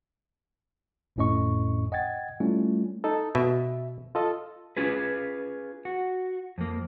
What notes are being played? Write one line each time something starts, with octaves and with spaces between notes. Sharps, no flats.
G1 F2 A2 C#4 D#5 C#6
D#5 F#5 G5 G#6 A6
G3 A3 C#4 E4 F4
D#4 A4
B2 E5
F4 A4 D#5
C#4 F4 G#4 B4
F#4
F2 A#3